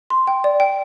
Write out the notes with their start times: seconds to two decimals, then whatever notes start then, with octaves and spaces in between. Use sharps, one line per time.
0.10 C6
0.27 G5
0.44 D5
0.60 G5